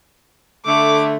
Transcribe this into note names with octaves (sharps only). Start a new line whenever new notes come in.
D3 A3 D6